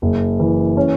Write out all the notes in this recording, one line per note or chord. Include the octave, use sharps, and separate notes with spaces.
F#1
E3
C#4